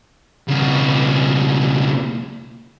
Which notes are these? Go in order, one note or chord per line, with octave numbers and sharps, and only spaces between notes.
C#2 B2